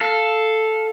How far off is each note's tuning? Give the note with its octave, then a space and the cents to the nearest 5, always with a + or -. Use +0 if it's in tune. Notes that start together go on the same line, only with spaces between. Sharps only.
A4 +0 F5 +0